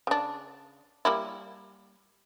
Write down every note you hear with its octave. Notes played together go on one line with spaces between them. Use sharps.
C#3 D4
G3 A#3 E4